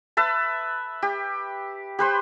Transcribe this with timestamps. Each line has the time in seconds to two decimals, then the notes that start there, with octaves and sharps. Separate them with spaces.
0.17 B4 E5 A5
1.02 G4
1.99 G4 B4 C5